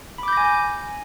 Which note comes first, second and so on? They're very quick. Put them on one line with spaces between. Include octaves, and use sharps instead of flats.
B5 D6 G6 A#6 G#5